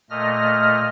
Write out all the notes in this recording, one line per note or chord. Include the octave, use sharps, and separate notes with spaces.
A#2 A3 D#5 F6 A#6